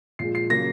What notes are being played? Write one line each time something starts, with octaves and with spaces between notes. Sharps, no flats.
A#2 F3 G#3 C7
C7
C#3 F#3 A#3 A#6